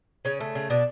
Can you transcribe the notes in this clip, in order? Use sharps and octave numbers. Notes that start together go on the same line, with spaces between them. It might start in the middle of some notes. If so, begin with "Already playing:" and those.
C#3 C#4
A3
C#3
B2 D4